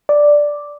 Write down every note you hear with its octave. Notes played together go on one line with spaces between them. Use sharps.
D5